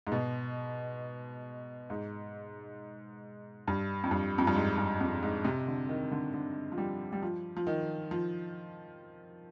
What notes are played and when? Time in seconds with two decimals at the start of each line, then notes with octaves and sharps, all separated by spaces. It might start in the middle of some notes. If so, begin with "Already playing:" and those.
0.07 G#2
0.12 B2
1.90 G#2
3.67 G2
4.04 F2
4.11 G2
4.38 F2
4.47 G2
4.55 G#2
4.78 G2
5.00 F2
5.23 G#2
5.45 C3
5.67 D3
5.89 D#3
6.11 D3
6.34 D3
6.72 F3
6.78 G3
7.13 G3
7.22 F3
7.57 F3
7.67 D#3
8.11 F3